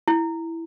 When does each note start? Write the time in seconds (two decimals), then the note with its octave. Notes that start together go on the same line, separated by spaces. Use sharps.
0.08 E4